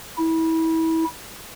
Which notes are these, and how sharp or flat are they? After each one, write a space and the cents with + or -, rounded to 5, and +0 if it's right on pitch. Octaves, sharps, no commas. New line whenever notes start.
E4 -25